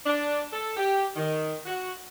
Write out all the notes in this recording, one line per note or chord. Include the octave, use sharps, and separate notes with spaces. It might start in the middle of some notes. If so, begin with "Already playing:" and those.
D4
A4
G4
D#3
F#4